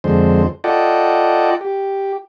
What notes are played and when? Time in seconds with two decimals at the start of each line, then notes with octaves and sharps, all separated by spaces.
0.04 F2 D3 G#3 C5
0.64 F4 A4 D5 D#5 F#5 G5
1.61 G4